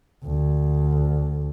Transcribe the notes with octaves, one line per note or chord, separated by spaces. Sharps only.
D2